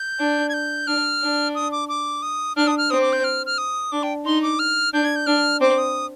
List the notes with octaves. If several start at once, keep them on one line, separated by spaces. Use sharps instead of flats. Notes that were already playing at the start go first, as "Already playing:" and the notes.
Already playing: G6
D4
G#6
G6
D4 F6
D4
D#6
D6
D6
D#6
D4 F6
D#6
F6
C4 D#6
D6
G6
F6
F6
D#6
D4 D6
G5
D#4 C6
D6
F6
D4 G6
G#6
G6
D4 F6
C4 D6
D#6